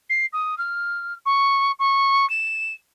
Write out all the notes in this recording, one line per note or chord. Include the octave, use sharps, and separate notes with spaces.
C7
D#6
F6
C#6
C#6
E7